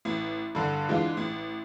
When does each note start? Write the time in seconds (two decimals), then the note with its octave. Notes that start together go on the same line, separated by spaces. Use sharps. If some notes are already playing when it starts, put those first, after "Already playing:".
0.05 A1
0.55 G2 D3
0.89 E3 G#3 D4 F4
1.17 A1